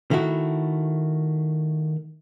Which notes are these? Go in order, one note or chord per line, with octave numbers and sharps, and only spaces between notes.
D#3 A3 E4 F#4